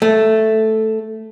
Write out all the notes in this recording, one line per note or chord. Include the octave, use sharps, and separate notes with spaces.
A3